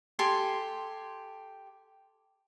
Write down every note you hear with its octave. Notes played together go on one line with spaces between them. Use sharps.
G4 A4 G#5 C6